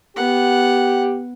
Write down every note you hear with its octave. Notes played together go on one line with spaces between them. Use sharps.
B3 G4 F#5